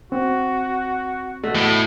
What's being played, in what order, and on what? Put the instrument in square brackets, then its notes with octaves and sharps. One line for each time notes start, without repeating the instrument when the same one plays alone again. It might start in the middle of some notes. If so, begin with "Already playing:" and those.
[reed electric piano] C4 [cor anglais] F#4
[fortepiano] A3 F#4 D#5
[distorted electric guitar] A2 [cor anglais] B3